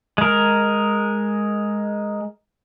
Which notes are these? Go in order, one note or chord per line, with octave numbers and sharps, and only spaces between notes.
G#3 A#4